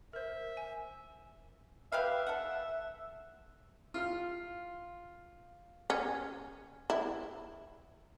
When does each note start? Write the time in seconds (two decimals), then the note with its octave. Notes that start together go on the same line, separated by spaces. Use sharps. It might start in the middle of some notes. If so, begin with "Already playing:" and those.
0.13 A#4 C5 E5
0.57 G#5
1.92 G4 B4 E5 F5
2.27 A4 F#5
3.94 F4 F6
5.90 C#4
6.90 E4